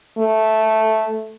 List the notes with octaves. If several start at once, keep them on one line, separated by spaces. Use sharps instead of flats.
A3